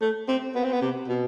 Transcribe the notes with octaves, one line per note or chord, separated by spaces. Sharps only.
A3
C4
B3
C4
B3
C3
B2